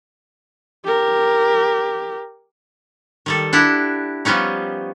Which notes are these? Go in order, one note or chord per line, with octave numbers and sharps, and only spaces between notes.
G4 A#4
D#3 G3 A4
D4 E4 G4 F#5
F3 G3 B3 C#4 D#4